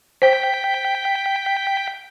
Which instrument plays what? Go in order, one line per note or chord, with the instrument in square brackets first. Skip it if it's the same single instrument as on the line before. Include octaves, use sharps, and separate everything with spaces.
[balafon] C5 [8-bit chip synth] G5 B6